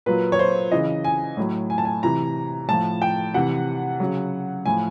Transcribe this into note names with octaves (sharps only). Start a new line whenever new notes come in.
A#2 F#3 B4
C#5
C5
C#3 E3 D#5
G#5
A2 F#3
G#5
A5
G#5
C3 E3 A#5
A2 F3 A5
G5
C3 E3 F#5
C#3 F#3
A2 F3 G#5